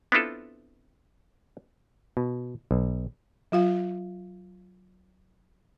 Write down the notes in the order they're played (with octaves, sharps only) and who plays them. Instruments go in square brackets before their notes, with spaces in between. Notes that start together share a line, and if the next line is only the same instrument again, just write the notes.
[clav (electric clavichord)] B3 C4 D4 E4 F4 A4
B2
B1
[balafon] F#3 F4 F5